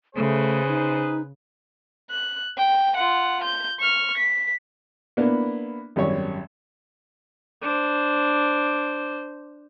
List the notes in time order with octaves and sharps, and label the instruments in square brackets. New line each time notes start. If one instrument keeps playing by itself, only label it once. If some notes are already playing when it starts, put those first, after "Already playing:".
[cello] C#3 [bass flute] A3 [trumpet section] G#4 B4 C5
[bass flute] D#4
[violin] F#6
G5
F4 F#5
G6
C#6 F6
B6
[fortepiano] A#3 B3 D4 E4
G#1 F#2 G3 C#5
[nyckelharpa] D4 C5